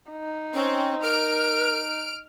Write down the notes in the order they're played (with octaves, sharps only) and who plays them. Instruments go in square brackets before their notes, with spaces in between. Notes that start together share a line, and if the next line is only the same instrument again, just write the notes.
[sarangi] D#4
[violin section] C4 [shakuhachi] C#4
[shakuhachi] A#4 [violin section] F6 D7